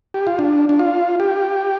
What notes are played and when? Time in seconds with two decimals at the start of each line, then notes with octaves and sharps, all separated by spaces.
0.14 G4
0.27 F4
0.39 D4
0.69 D4
0.79 F4
1.20 G4